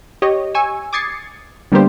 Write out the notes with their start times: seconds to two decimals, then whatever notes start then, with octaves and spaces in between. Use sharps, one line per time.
0.22 G4 C#5 D#5
0.55 G#5 C#6 E6
0.93 D6 D#6 G#6 A6 C7 C#7
1.72 D3 G3 A#3 B3 G4 C5